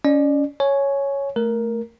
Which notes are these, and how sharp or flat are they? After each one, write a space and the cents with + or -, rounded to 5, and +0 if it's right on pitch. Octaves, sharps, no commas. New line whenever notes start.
C#4 +25 D5 +35
C#5 +0 G#5 +20
A3 +0 A#4 +5